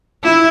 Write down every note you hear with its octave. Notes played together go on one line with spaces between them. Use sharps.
E4